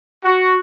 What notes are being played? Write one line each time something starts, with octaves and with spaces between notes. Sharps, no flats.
F#4